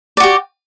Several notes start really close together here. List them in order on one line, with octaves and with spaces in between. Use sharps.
D5 F#4 G4